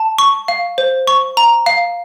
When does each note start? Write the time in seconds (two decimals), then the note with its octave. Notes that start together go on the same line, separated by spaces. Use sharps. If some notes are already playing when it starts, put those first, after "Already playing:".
Already playing: A5
0.19 C#6
0.48 F5
0.78 C5
1.07 C#6
1.37 A#5
1.66 F5